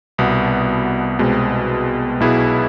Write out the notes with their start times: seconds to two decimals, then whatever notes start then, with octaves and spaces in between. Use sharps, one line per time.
0.18 C2 B2 B3
1.18 C2 B2 G#3 C4
2.20 B1 B2 B3 E4 G#4